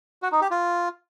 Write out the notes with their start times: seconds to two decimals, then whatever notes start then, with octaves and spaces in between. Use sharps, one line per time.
0.22 F#4
0.32 D#4
0.41 G4
0.51 F4